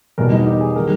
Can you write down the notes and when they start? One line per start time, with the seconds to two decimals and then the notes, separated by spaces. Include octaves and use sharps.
0.18 E2 B2 G3 A#4
0.32 D#4
0.46 G4
0.61 G#4
0.76 D#3 G3 A#4